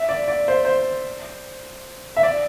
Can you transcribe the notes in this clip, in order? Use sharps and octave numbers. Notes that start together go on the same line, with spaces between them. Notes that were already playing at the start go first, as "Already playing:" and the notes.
Already playing: E5
D5
D5
C5
C5
E5
D5